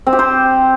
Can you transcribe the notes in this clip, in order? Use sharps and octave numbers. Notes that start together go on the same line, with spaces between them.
C4
G4
C5